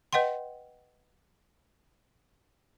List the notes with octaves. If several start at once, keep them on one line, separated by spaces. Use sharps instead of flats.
B4 D#5 F#5 G5 C6